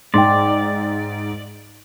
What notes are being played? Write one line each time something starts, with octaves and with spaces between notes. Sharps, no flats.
G#2 D5 G5 C6